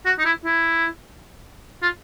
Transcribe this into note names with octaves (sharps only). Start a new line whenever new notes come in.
F#4
D#4
E4
E4
F4